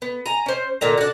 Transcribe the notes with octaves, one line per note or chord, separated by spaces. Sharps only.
B3
G#5 A#5
C#4 C5
A#2 D3 A#5
D4 F#4